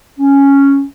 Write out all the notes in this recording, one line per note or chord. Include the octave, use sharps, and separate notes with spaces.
C#4